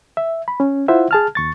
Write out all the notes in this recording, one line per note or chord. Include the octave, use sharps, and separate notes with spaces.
E5
B5
C#4
E4 F4 C5 E5 F#5
G#4 A5 F6
D#2 C#6 A6